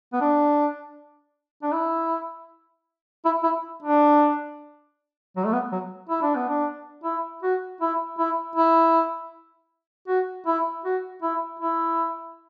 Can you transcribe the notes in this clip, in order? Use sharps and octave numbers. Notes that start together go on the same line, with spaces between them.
B3
D4
D4
E4
E4
E4
D4
F#3
A3
B3
F#3
E4
D4
B3
D4
E4
F#4
E4
E4
E4
F#4
E4
F#4
E4
E4